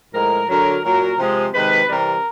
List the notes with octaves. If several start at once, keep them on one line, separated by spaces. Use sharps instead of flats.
A2 F3 G#3 A#4
D3 F#3 A#4
A#2 F#3 A#4
C3 F3 G#3
C3 D#3 G#3 B4
C3 E3 G3 A#4